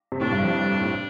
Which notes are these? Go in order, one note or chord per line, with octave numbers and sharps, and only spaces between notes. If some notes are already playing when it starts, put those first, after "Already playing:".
C3
A2 D4
G2
F2
A2